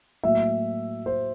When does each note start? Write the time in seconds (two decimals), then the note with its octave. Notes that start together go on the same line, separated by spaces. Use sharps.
0.23 A2 F#3 A#3 E5
1.06 C5